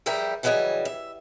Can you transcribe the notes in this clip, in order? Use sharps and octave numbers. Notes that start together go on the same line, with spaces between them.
E2 F3 G3 A#4 E5 G5
C#3 E3 F#3 G3 D#5 G#5
E5